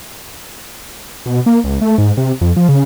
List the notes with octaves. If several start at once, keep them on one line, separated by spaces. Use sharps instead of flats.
B2
A#3
C#2
A3
G#2
C3
F2
F3
C#3